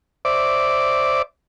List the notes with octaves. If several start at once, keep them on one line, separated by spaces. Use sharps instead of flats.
C5 D5 E5 D6